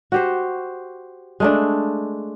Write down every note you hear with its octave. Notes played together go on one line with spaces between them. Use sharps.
F#4 G4 C5
G#3 A3 D4